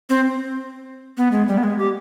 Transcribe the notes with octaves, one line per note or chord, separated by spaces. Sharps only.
C4
B3
G#3
G3
B3
G#3
G4